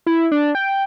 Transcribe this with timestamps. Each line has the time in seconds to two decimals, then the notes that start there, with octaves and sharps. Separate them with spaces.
0.06 E4
0.32 D4
0.55 G5